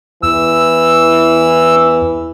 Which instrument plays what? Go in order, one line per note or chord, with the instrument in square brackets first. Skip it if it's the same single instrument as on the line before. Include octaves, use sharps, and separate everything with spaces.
[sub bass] E2 [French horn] E3 [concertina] E6